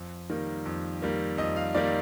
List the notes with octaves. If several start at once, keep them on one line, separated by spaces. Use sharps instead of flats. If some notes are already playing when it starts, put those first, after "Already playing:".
Already playing: F2
D#3 G3 A#3
F2
D#3 G3 A#3
F2 D#5
F5
D#3 G3 A#3 D5